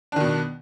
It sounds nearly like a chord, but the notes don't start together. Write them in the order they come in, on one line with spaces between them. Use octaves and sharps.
D4 D#3 B2